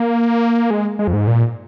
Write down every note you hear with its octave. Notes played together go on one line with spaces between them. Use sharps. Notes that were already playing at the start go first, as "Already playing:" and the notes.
Already playing: A#3
G#3
G#3
F2
G#2
A#2